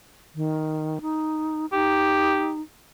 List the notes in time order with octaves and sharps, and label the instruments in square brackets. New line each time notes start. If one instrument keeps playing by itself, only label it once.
[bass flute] D#3
D#4
[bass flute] D#4 [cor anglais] G4